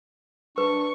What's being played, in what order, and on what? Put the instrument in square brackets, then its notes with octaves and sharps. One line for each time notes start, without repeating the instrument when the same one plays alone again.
[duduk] D4 [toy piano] B4 [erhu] C#6